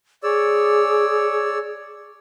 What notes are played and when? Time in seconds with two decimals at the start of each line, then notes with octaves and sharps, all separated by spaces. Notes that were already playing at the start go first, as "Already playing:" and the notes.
0.23 G#4 C#5 D5 E6